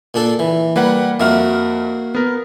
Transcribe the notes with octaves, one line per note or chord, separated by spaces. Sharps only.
A#2 D4 A4
E3
G3 A#3 B4 F#5
F2 A#3 F#4 E5 F6
B3 A#4